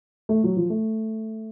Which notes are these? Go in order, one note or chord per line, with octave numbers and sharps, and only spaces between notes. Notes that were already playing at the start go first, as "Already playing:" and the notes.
A3
F#3
F3
A3